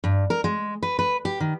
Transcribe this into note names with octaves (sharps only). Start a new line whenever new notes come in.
G2
A#4
G#3
B4
B4
G4
D#3